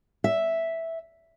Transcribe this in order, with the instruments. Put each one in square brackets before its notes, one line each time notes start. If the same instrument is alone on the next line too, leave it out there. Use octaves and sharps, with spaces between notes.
[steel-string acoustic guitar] E5